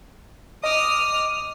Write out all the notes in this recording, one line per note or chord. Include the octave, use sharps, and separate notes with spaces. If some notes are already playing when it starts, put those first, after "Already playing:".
D#5 D6 D#6 F6